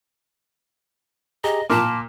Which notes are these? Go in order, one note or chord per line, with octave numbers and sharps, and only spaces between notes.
G4 G#4 D#5 A#5
A#2 A#3 A5 C6 D6 F6